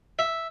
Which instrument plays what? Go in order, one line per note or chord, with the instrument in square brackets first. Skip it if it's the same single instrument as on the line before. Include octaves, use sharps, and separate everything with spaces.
[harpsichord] E5